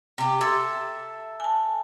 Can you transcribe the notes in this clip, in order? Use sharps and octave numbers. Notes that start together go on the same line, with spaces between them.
C3 G4
A4 E5 C6 G#6 A6
G#5 A5